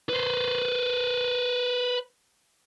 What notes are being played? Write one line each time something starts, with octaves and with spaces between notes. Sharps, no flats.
B4 C5